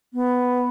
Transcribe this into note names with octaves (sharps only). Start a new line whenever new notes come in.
B3